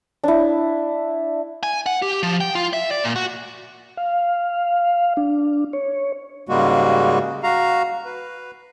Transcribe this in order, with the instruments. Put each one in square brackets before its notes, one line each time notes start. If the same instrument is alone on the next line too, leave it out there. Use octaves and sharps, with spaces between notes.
[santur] D4 E4
[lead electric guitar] G#5
F#5
G4
F3
G5
F4
E5
D5
A#2
F#4
[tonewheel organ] F5
D4
C#5
[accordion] G#2 C#3 G3 G#3 A#3 F#4
F#4 F5 A#5
B4